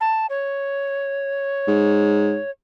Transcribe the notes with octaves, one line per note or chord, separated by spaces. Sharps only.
A5
C#5
G#2